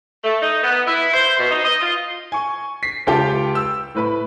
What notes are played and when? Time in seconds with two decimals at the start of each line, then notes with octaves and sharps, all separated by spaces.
0.24 A3
0.42 D#4
0.63 B3
0.87 E4
1.14 C5
1.39 B2
1.51 D#4
1.65 D#5
1.80 F4
2.32 G#5 C#6
2.83 B6 C7
3.07 C#2 F4 G4 G5 A5
3.55 E6
3.95 A2 B4 B5